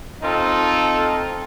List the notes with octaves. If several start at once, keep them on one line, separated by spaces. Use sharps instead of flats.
C4 D#4 F4 A4